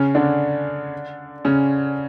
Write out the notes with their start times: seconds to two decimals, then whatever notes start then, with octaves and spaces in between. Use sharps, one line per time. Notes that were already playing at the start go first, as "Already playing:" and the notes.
Already playing: C#3 C#4
0.15 D3 D4
1.45 C#3 C#4